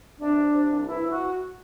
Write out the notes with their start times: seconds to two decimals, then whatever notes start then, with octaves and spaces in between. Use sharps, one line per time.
0.20 C3 D4
0.37 C3
0.53 C3
0.71 C2
0.87 E3 E4
1.05 E3
1.11 F#4